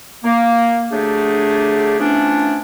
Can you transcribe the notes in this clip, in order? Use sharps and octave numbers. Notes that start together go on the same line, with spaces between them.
A#3
D3 F#3 A3 D4 G4 G#4
E3 F3 A3 B3 C#4 D4